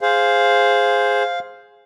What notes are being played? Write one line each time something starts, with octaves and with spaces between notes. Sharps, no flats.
G#4 C5 F5